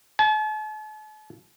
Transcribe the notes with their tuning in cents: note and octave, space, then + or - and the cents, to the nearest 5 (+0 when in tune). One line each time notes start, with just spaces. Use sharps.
A5 -45